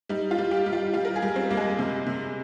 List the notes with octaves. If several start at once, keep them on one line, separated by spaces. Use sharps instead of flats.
G3 D#4
F4
G3
G4
G3
F4
G3 F4
A#4
G#4
G3
C4
G3 A#3
G#3
C3
C3